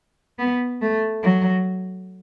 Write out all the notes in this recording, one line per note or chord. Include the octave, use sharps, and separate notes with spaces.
B3
A3
F#3